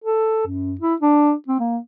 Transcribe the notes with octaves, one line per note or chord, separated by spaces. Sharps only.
A4
F#2
E4
D4
C4
A#3